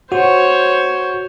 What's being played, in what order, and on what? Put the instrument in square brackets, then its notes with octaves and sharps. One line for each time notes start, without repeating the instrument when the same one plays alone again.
[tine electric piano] F#4 [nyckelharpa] C5 C#5